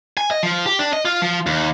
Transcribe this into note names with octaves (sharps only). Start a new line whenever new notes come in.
G#5
D#5
F3
G4
D4
D#5
F4
F3
D#2